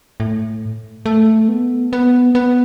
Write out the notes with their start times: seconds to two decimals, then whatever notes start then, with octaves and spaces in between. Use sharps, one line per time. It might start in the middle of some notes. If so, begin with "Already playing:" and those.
0.20 A2
1.06 A3
1.48 B3
1.93 B3
2.35 B3